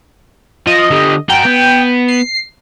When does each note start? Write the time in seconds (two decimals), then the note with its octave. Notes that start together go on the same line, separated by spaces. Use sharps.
0.67 F3 D#5
0.91 D3 G3
1.29 F#4 A#4 G5
1.45 B3
2.08 C7